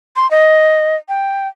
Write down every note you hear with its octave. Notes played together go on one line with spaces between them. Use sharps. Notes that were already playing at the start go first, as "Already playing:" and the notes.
C6
D#5
G5